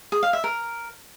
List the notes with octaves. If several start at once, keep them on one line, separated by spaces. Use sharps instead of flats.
G#4
F5
E5
A#4